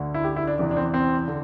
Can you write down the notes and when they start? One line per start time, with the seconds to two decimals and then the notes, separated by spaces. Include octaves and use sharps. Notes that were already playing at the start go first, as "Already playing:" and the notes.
Already playing: D2 D3
0.14 E4
0.24 G4
0.36 E4
0.47 D4
0.58 E2 C3 E3 D4
0.71 D4
0.77 C4
0.94 C4
1.28 D3